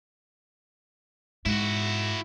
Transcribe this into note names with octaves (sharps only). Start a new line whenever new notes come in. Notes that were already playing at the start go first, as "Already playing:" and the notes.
G#2 E4 F#4